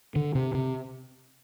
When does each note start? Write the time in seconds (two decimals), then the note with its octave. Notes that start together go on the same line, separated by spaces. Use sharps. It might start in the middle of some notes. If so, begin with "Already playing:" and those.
0.16 D3
0.35 C3
0.54 C3